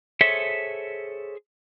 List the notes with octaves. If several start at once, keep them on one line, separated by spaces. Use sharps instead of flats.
G#4 A4 C5 C#5 E5